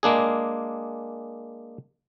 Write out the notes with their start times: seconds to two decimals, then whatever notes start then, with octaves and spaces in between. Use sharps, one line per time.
0.03 G#3 A#3 D4 G#4